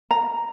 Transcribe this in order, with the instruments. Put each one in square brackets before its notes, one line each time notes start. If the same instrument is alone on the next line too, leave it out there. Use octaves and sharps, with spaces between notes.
[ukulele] A#5